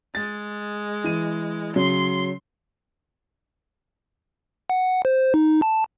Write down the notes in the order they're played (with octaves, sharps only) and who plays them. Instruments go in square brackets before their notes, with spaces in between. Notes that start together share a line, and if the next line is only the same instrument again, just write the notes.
[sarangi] G#3 [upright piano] A6
[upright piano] E3 D#7
[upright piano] C#3 F#3 [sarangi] C6
[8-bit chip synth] F#5
C5
D#4
A5